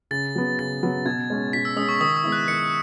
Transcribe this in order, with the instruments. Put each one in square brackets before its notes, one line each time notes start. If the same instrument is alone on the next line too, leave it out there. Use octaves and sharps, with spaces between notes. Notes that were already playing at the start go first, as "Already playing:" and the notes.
[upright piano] C#3 [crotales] A6
[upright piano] F#3 B3
[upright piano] C#3 [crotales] A6
[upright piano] F#3 B3
[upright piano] B2 [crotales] G#6
[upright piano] G#3 C#4
[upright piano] B2 [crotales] B6
[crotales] E6
[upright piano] G#3 C#4 [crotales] D#6
[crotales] C#6
[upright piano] D#3 [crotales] D#6
[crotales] E6
[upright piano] G#3 B3 E4
[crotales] F#6
[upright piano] D#3 [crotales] C#7